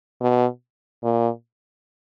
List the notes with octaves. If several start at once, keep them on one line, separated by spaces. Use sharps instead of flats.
B2
A#2